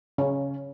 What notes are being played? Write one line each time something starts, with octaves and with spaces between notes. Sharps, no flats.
C#3 C#4